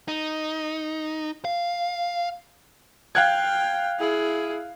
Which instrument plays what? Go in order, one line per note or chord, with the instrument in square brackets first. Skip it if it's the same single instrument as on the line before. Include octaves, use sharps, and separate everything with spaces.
[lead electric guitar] D#4
F5
[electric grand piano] F5 F#6 G#6 [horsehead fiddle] G5
[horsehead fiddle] E4 G#4